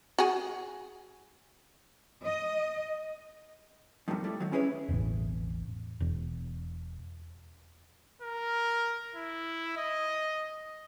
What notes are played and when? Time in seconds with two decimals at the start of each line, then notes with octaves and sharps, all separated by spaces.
0.18 F#4 G#4
2.25 D#5
4.08 F2 G#2 C3 D#3 F#3 G3
4.24 G3 A3 E4
4.40 D#3 F#3
4.52 C#4 E4 G#4 A4 B4 C#5
4.89 E1 A1
6.00 E1
8.22 A#4
9.15 E4
9.77 D#5